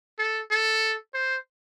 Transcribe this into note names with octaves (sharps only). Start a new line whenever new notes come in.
A4
A4
C5